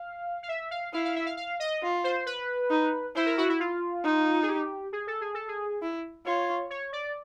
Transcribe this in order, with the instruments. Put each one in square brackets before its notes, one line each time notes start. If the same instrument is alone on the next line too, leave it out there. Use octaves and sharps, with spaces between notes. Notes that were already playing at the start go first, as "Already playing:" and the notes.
Already playing: [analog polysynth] F5
F5
E5
F5
[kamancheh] E4 [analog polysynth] F5
[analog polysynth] F5
E5
F5
F5
D#5
[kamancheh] F4
[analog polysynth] C5
B4
[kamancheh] D#4
[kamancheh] E4 [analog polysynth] C5
[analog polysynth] A#4
F#4
E4
F4
[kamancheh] D#4
[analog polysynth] G#4
G4
G#4
A4
G#4
A4
G#4
[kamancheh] E4
[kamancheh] F4 [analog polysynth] C#5
[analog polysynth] C#5
D5